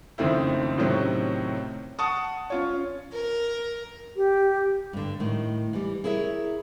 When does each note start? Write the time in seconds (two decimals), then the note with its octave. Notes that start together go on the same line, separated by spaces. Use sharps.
0.18 F#1 F2 D#3 A3 C4 E4
0.78 A2 C3 D#3 F#3 C4 C#4
1.99 F#5 A5 C#6 D#6
2.50 C#4 F4 C#5
3.12 A#4
4.16 G4
4.93 G2 D3
5.20 A2 D#3
5.73 E3 G3
6.04 E4 G#4 A#4 C#5 E5